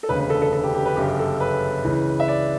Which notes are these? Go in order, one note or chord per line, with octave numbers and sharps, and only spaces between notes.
A4
E1 D2 C#3 B4
B4
A4
A4
A4
G4
G4
B4
G1 F#2 C#3 G4
G4
A4
B4
C#2 C#3 E3
E5
D5